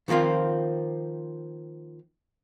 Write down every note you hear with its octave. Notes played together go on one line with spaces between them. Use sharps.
D#3 F3 A#3 C4 F4